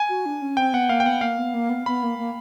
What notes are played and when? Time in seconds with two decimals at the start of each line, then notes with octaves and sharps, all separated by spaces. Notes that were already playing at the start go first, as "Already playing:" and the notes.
Already playing: G#5
0.09 F#4
0.26 D4
0.42 C#4
0.57 C4 G5
0.73 B3 F#5
0.89 A#3 F5
1.00 G5
1.05 B3 F#5
1.21 A#3 F5
1.38 B3
1.54 A#3
1.70 B3
1.86 B3 B5
2.03 A#3
2.18 A#3